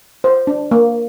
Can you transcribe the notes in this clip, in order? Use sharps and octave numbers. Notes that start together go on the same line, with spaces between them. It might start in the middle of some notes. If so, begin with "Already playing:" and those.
C5
D4
A#3